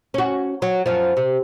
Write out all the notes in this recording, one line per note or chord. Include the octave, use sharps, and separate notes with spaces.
C#4 F#4
F#3
F#2 F3
C3